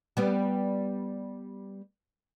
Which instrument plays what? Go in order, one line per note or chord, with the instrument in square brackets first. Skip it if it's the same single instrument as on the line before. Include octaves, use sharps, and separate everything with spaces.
[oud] G3 B3